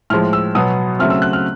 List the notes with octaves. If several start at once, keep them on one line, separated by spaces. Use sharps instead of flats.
A2 F3 G#3 F6
E6
B2 F#3 B3 D#6
C#3 F#3 A3 C4 F6
E6
F#6
F6